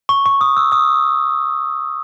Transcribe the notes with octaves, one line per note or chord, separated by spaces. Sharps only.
C#6
C#6
D#6
E6
D#6